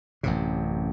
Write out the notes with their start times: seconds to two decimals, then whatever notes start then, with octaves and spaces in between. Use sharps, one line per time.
0.23 A1 F#2 C3